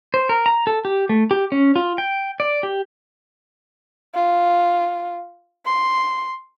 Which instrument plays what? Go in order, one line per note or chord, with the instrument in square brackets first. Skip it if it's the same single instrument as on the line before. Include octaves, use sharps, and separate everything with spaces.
[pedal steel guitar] C5
A#4
A#5
A4
G4
A3
G4
C#4
F4
G5
D5
G4
[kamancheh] F4
C6